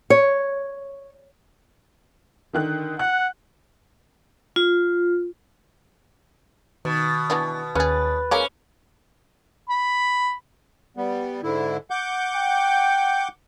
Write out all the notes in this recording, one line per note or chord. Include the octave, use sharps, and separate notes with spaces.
C#5
D3 D#3 F#6
F#5 F#6
F4
B2 D#3
E3 B3 D4
D#2 C#4 G#4 B4 A6
G#3 A#3 C#4 A#4 D6
B5
G3 B3
G#2 D3 E4
F#5 D6 G6
G5